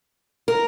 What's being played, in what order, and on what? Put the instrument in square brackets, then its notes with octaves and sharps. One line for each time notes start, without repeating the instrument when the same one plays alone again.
[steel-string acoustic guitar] A#4